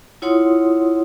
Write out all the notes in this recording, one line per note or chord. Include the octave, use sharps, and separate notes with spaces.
E4 F4 C#5 F#5 C6 D#6